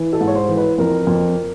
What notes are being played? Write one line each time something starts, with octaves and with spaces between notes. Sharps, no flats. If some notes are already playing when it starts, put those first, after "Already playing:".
Already playing: E3
A4
G#2
C#5
C5
E3
B4
F2 A#4
F2